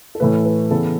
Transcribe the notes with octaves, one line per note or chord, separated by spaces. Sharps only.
A4
A2 E3 A3 B4
B4
C#3 E3 B3 A4